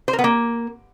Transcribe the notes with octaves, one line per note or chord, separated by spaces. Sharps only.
C5
A#4
B3
A#3